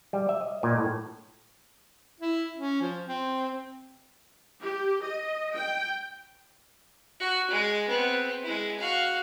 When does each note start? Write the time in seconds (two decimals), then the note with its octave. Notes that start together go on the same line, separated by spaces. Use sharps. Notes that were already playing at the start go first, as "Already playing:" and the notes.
0.13 G3
0.29 E5
0.41 D#5
0.63 A#2
0.78 A2
2.20 E4
2.56 C#4
2.82 F3
3.07 C4
4.61 G4
5.03 D#5
5.54 G5
7.20 F#4
7.51 G#3
7.88 B3 C4
8.43 G#3 E4
8.79 F#4 F5